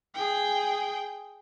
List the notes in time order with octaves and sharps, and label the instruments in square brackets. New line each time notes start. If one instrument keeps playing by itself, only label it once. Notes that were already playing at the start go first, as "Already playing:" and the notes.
[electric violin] G#4 G5